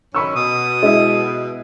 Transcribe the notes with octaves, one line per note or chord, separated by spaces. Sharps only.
F#2 D#3 C#4 B5 C#6 E6
B2 D#6
G#3 E4